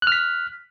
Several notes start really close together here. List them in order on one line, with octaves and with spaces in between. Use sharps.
F#6 F6 B6